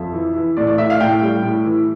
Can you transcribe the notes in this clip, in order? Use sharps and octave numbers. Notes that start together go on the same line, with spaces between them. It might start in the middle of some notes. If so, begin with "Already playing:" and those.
Already playing: F2 E5
E3
E3
A2 D5
D5
A2 E5
F5
A2 G5
G3
A2
E3